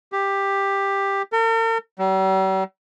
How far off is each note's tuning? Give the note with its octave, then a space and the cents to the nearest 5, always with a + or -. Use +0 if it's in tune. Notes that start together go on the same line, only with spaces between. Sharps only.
G4 +10
A#4 -45
G3 -45